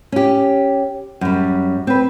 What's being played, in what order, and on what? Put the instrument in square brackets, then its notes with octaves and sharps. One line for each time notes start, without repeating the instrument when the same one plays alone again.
[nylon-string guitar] C#4 G4
F#2 G3
C4 B4